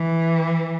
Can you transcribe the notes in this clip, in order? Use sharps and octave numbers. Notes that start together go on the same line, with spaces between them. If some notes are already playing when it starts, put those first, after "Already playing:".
Already playing: E3